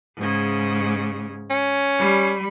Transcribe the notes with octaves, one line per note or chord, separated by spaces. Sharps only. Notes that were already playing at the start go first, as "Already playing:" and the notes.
G#2 C#3
C#4
G3 B5